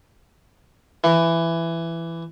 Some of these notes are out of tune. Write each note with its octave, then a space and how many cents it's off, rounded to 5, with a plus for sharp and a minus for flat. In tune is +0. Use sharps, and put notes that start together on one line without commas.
E3 +15